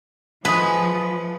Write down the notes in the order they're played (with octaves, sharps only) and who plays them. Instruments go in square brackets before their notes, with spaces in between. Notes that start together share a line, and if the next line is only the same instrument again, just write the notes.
[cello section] F3 [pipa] G#3 A3 G#4 [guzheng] B4